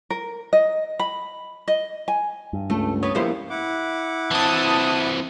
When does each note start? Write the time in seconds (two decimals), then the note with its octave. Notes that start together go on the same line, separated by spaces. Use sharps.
0.10 A#4
0.53 D#5
0.99 B5
1.68 D#5
2.08 G#5
2.53 G2
2.70 C#2 A3
3.03 B3 C#5 D#6
3.15 F3 A#3 B3 E4 G4 C5
3.50 E4 F#5 D6
4.31 E3 C4 A5 D#6